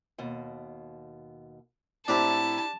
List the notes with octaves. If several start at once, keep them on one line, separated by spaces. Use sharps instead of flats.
D#2 B2
A2 C4 D4 E4 G4 A5 A#5